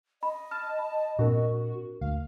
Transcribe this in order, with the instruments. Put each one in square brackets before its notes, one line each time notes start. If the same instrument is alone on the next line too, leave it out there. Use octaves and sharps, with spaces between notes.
[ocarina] D#5 [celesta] B5
[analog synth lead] A5 [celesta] F6
[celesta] B5
[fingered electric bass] A#2 C4 [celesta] D4 A#4 [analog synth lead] F#4
[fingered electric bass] D2 [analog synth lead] F5